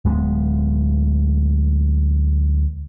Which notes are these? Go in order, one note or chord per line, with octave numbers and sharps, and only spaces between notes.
D1 G#3 A#3 B3